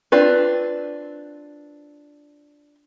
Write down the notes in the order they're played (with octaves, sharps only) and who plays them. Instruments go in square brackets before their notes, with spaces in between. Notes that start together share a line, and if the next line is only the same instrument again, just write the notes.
[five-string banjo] C4 D4 F4 B4